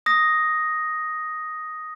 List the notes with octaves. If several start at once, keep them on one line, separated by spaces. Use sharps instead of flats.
D#6 A#6